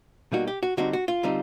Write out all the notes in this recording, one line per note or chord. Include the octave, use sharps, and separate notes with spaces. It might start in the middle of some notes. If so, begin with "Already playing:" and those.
B2 G3 A#3 D#4 F#4
G4
F#4
D3 G3 C4 D#4 F#4
F#4
F4
D3 G3 C4 D#4